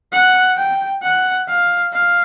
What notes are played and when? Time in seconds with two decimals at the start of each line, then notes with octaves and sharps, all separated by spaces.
0.12 F#5
0.57 G5
1.02 F#5
1.48 F5
1.93 F5